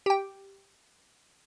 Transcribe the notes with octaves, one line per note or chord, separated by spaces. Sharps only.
G4 G5